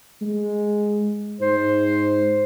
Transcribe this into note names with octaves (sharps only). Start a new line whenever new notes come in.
G#3
G#2 C5